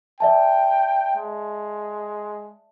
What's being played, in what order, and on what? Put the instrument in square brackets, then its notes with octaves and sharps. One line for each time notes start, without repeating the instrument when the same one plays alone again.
[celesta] D5 E5 A5 [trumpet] G5
[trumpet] G#3